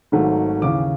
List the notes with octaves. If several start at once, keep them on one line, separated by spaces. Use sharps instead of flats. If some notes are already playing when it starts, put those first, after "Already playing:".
G#1 G#2 D#3 F#3 A3
D#2 C#3 E3 D6